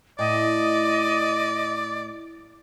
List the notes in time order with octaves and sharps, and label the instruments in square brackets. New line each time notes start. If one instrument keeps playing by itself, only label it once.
[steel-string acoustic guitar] A2 [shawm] D5 [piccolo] D#5